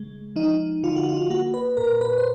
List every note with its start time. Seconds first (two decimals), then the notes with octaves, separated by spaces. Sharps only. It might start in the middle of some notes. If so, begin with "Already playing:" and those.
Already playing: C#3 G#3
0.36 F3 D#4
0.83 D3 F4
0.96 F#4
1.09 F4
1.30 A#3 F#4
1.54 B4
1.77 A#2 A#4
2.01 B4
2.18 C5